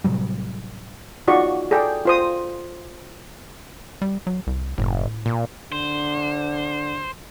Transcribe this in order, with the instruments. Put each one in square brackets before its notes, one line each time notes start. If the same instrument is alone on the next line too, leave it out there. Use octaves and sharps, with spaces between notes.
[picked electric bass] A2 C3 F#3 G3
[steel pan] D#4 F4 F#4 G#4 D5 C#6
G#4 A4 D5 G5
F4 C5 D#6
[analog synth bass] G3
F#3
C2
[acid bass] F#1 [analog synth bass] A2
[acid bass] A#2
[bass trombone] D3 [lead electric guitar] C5